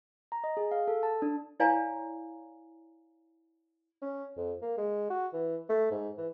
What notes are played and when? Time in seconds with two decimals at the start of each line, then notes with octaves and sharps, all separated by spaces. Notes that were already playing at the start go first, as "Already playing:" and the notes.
0.32 A#5
0.44 D#5
0.57 G#4
0.71 F5
0.88 A4
1.03 A5
1.22 D4
1.60 E4 C#5 D5 F5 G#5 A#5
4.02 C#4
4.37 F2
4.62 A#3
4.78 G#3
5.10 F#4
5.33 E3
5.69 A3
5.91 G#2
6.18 E3